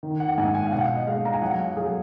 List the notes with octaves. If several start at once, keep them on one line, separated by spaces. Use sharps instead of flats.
D#3
F#5
F#5
G#2 G#5
G#5
F5
B2 F#5
D#5
G#3 F5
A#5
G#5
F#3 F#5
F5
F#3 G#4